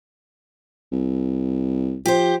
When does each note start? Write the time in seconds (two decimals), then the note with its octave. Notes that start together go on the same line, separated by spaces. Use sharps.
0.92 C2
2.06 F3 G4 C5